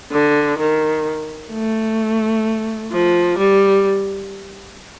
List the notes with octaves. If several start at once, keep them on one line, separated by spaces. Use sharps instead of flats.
D3
D#3
A3
F3
G3